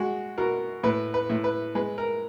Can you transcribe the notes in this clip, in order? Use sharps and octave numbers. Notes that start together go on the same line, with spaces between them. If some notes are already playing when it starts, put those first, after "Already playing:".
Already playing: G#3 F#4
B2 A#4
A2 B4
B4
A2
B4
G#3 B4
A#4